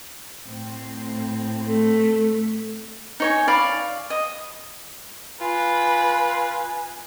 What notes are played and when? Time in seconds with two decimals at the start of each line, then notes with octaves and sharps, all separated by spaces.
0.46 A2 C4
1.69 A3 A4
3.20 D#4 C#5 G#5
3.48 D5 F5 B5 C#6
4.10 D#5
5.41 F4 B4 G#5